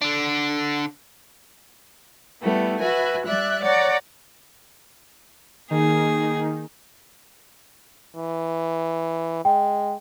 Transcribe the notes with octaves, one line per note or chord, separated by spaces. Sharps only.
D3 D4
G3 A3 B3 E4
F#4 B4 E5 G#5
G3 D5 E5 F#6
C#5 D5 F#5 A#5
D#3 A#3 D#4 G#4
E3
G#3 G5